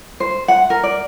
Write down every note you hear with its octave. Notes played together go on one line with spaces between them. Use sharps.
C5
F#5
A#4
D5